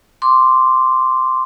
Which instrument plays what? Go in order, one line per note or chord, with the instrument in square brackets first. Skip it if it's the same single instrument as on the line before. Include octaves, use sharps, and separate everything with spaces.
[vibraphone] C6 D6